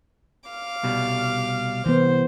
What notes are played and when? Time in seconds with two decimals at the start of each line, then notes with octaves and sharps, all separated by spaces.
0.49 F5 D6 F6
0.83 C2 B2 G3
1.86 C2 E3 B3 C5